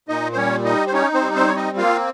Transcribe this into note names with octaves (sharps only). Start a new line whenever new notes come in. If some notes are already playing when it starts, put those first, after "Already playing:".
A#2 D#4 D#5
C5
G3 C#4 C#5
D#4 D#5
C5
C#4 D#4 C#5
C4 C5
G3
C4 C5
C4 C#5
D#4 D#5
A#3 F4 F5